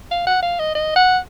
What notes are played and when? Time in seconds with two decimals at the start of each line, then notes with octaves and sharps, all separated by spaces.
0.11 F5
0.27 F#5
0.42 F5
0.59 D#5
0.75 D#5
0.96 F#5